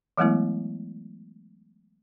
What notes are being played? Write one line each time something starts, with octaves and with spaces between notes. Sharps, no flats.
E3 F#3 G#3 A3 B3 E4